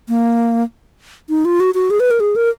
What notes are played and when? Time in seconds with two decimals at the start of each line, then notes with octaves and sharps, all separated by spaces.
0.09 A#3
1.29 D#4
1.45 F4
1.60 F#4
1.75 F#4
1.90 G#4
2.00 B4
2.11 A#4
2.20 G#4
2.36 A#4